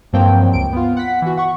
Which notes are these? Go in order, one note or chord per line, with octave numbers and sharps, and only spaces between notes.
G2 F3 F#3 A#3 C4 G5
C#2 D7
B3 F4
F#5 B6
E3 F#4
F#5 C#6